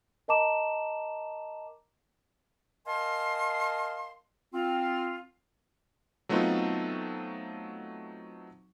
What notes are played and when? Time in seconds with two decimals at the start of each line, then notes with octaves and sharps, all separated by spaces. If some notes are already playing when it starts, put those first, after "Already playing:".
0.28 A#4 D#5 A5 A#5 D6 E7
2.87 A#4 D#5 F5 G#5 A5 C6
4.54 C4 F4
6.29 F#3 A3 B3 C4 D#4 F4